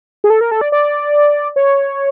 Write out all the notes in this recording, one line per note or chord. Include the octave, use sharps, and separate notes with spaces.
G#4
A4
A#4
A4
D5
D5
C#5